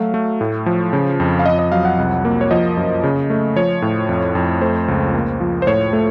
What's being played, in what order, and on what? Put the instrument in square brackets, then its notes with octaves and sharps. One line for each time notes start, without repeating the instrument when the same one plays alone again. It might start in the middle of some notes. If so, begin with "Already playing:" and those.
Already playing: [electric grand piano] F#3 A3 F5
A3
A2
F3
C#3
F2
F5
F2 D#5
D#5
F#3 F5
F#5
C2
A#3
C#5
F3 D#5
F#2
C#3
A3
F3 C#5
A2
F2
F2
A3 C5
C#2
A#3
F3
C5
A2 C#5
A3